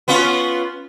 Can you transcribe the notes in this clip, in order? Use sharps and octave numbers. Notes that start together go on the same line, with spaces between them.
B3 C#4 F4